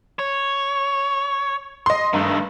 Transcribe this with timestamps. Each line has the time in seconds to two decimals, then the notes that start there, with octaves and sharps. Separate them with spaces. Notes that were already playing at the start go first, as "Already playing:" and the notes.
0.19 C#5
1.86 D#5 C6
2.13 G2 D#3 A3